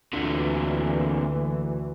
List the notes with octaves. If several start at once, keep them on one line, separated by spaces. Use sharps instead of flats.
D2 A#2 D3 E3